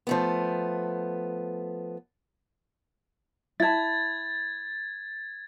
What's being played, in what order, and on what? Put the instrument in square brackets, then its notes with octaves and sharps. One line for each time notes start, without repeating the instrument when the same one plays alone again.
[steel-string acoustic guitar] F3 A3 B3
[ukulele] E4 A5 [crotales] G#6 A6